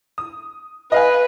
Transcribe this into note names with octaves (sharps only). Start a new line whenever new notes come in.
D#6
B4 D#5 F5 G#5